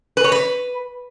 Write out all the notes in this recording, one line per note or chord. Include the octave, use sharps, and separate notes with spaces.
B4
C#5
B4